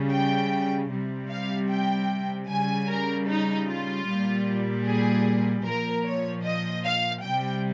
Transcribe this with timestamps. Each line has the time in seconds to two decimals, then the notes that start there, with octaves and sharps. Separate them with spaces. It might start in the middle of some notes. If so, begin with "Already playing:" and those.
Already playing: C#3 G3
0.11 G5
0.90 C3 G3
1.30 F5
1.69 G5
2.49 C#3 G3 G#5
2.88 A#4
3.27 D#4
3.67 F4
4.07 A#2 G3
4.86 G#4
5.65 A#2 F3 A#4
6.05 C#5
6.44 D#5
6.84 F5
7.23 C3 G3 G5